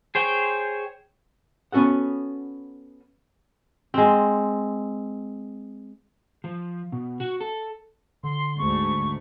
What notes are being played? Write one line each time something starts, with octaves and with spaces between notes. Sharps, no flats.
G#4 C5 C#5 G5
B3 C#4 F#4 A4 F#5
G#3 C4
F3
B2
F#4
A4
D3 C6
D2 G#2 A3 C#6